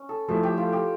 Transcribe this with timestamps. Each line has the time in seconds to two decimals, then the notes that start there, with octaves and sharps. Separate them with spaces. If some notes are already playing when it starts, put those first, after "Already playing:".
Already playing: C#4
0.09 A4
0.28 F3 A3 E4 A4
0.43 G4
0.57 F4
0.73 G4